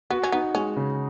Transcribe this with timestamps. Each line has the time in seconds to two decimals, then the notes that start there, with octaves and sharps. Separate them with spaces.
0.10 B3 F#4
0.23 C#4
0.32 B3 D#4
0.55 G#3 C#4
0.77 C#3